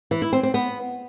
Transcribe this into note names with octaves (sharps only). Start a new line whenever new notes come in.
E3
E4
C4
C4
B3